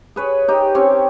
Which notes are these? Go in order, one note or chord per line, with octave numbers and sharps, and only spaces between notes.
G#4 B4 C#5
D#4 G4
C4 C#4 G4 C#5